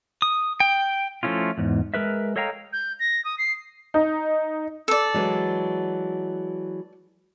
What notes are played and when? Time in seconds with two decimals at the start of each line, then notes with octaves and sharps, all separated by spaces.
0.22 D#6
0.60 G5
1.23 F3 A3 C#4 E4 F4
1.58 E2 G#2
1.94 G#3 A#4 B4 E5
2.36 A4 C#5 D#5 F5 G5 A#5
2.73 G6
3.00 A#6
3.25 D#6
3.38 C7
3.94 D#4
4.88 A4 D5
5.14 E3 F#3 G#3